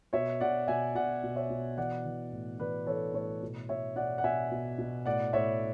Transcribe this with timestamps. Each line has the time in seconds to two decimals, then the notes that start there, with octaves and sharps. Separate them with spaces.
0.13 B2 C#5 E5
0.40 B2 D5 F#5
0.68 B2 E5 G#5
0.95 B2 D5 F#5
1.23 B2
1.36 C#5 E5
1.50 B2
1.78 E3 D5 F#5
2.05 E3
2.32 A2
2.59 E3 B4 D5
2.87 E3 A4 C#5
3.14 A2 A4 C#5
3.42 B2
3.69 B2 C#5 E5
3.96 B2 D5 F#5
4.18 F#5
4.24 B2 E5 G#5
4.52 B2
4.78 B2
5.06 A2 D5 F#5
5.33 A2 C#5 E5